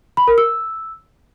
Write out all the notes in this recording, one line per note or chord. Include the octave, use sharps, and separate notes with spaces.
B5
A#4
E6